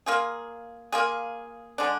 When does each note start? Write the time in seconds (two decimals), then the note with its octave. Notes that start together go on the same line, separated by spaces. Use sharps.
0.06 A#3 F4 G#4
0.92 A#3 F4 G#4
1.78 D3 G#3 D4